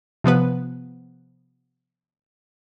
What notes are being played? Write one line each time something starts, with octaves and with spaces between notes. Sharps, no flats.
C3 F3 B3 B4